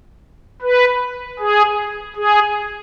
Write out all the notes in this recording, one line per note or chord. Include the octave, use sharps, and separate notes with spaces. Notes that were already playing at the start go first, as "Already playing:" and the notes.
B4
G#4
G#4